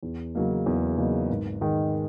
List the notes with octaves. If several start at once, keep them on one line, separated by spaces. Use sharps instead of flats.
E2
C#3 F#3 A#3 D#4
E2
C#3 F#3 A#3 D#4
G#1
G#2 D#3 G#3